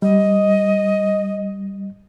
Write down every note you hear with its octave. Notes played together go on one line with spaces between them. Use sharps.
G3 D#5